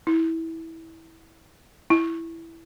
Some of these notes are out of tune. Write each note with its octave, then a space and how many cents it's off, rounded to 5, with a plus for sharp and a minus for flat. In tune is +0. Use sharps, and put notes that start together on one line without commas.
E4 -20
E4 +5